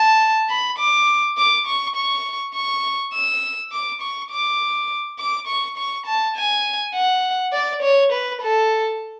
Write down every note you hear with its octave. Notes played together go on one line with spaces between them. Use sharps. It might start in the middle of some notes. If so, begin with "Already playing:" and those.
Already playing: A5
B5
D6
D6
C#6
C#6
C#6
E6
D6
C#6
D6
D6
C#6
C#6
A5
G#5
F#5
D5
C#5
B4
A4